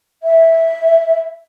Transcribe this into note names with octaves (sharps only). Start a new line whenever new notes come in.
E5